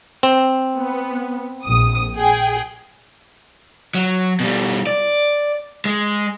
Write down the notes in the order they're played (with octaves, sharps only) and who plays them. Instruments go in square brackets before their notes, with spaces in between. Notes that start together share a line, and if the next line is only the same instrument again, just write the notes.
[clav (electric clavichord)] C4
[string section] B3
A#1 D#6
G#4 G5
[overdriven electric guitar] F#3
B2 G3
D5
G#3